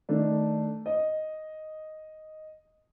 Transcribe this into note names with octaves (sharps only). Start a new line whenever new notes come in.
D#3 A3 D4
D#5